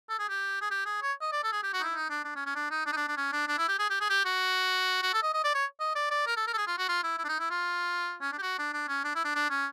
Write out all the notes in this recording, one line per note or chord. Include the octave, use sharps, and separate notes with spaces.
A4
G#4
G4
G#4
G4
G#4
C#5
D#5
D5
A4
G#4
G4
F#4
D#4
E4
D#4
D4
D4
C#4
C#4
D4
D#4
D4
D#4
D4
D4
C#4
D4
D4
E4
G4
G#4
G4
G#4
G4
F#4
F#4
A4
D#5
D#5
D5
C#5
D#5
D5
D5
A#4
A4
A#4
A4
G#4
F4
F#4
F4
E4
E4
D4
D#4
E4
F4
C#4
D4
G4
F#4
D4
D4
C#4
D4
E4
D4
D4
C#4